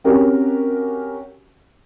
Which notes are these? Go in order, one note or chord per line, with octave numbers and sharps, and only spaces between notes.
C4 C#4 F#4 G4 A#4